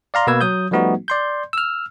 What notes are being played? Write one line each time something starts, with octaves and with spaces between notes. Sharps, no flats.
D5 F5 A#5 C6
B2 A#3 B4 E6 G#6
F#3 D#6 G6
F3 G3 A3 B3 D#4 F#4
D5 C6 G6
E6 F6